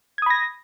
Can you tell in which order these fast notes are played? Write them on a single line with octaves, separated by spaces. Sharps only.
G#6 D#6 B5 A#6